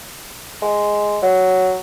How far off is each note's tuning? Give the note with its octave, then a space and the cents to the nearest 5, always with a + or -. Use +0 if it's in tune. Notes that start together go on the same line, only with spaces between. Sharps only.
G#3 +0
F#3 +5